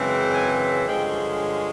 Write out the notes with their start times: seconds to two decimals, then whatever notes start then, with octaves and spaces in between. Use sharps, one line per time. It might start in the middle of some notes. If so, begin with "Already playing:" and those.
Already playing: F#2 C#3 E3 G#3 C4
0.32 G#5
0.87 G2 D3 F3 G#3 C#4 G5